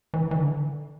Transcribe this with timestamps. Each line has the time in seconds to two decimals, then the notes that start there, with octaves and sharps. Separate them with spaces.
0.14 E3
0.31 E3
0.35 D3